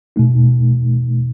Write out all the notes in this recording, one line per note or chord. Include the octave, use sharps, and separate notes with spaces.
B2 A3 D#4